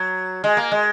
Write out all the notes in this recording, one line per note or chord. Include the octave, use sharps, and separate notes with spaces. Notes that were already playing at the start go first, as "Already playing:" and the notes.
Already playing: F#3
G#3
A#3
G#3